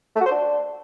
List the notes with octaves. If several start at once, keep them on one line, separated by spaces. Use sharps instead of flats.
A3
F#4
C5
D4